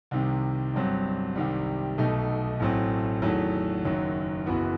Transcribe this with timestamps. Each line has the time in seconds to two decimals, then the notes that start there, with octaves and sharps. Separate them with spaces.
0.11 C2 C3 D#3
0.74 G1 G2 F#3 C4
1.36 C2 C3 D#3 G3
1.98 B1 B2 A3 D#4
2.60 A1 A2 F#3 A3 C4
3.22 E2 D#3 F#3 A3
3.84 F#1 F#2 D#3 F#3
4.46 F#1 F#2 E3 B3 F#4